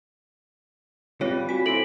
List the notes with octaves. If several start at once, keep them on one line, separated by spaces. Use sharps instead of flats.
G3 C4 F4 G4 B4 C#5
F#4 G#5 B6
C4 E4 A4 D7 F#7